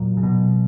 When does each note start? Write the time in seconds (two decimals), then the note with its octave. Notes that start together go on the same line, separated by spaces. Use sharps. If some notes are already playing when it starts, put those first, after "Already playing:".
Already playing: E2 A#2 F#3
0.17 C#3
0.23 B2